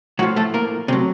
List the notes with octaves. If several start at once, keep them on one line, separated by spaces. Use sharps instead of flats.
A2 F3 F#3 F#4
A3 A4
A#3 A#4
A2 C3 F#3 C4